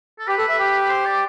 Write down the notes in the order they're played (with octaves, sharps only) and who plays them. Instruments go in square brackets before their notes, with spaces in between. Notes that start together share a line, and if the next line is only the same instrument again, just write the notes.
[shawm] A4
[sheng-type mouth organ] G4 [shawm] B4
[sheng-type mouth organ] A4
E5
G4
[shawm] C5
D5